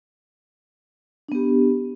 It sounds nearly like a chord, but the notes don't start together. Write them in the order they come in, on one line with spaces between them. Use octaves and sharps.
D4 B3 G4